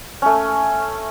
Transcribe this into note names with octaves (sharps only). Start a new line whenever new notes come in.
A3 C#4